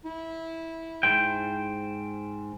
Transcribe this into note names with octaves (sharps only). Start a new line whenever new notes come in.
E4
G#2 C5 G5